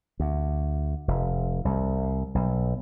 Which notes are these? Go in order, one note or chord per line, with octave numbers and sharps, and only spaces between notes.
D2
F1
C2
B1